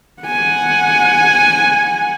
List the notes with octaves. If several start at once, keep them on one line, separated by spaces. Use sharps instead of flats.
F#5 G#5